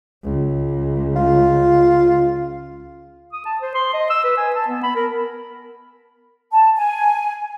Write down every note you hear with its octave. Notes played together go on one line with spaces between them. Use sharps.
C#2
F4
D#6
A5
C5
C6
D#5
E6
B4
G#5
A5
B3
B5
A#4
A5
G#5